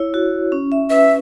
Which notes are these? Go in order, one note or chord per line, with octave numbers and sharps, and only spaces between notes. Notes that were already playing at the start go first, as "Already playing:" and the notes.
Already playing: E4 C#5
F#4
C#4
E5
B4 E5